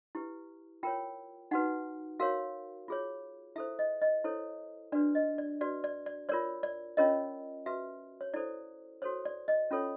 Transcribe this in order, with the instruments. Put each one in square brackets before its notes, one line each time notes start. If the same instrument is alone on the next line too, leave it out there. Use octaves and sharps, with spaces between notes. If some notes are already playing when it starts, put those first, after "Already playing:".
[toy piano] E4 G4 B4
F4 A#4 C#5 G5
D#4 F#4 B4 F#5
F#4 A#4 C#5 F5
F4 G#4 C#5
E4 A4 C5 E5
D#5
D#5
E4 A4 C5 C#5
D4 F#4 B4 D5
D#5
D5
F#4 B4 D5
D5
D5
F4 A#4 C#5 D5
D5
C#4 F4 A#4 C#5 D#5
F#4 B4 E5
C#5
E4 A4 C5 D5
F#4 A4 C5 C#5
D5
D#5
C#4 F4 A4 C#5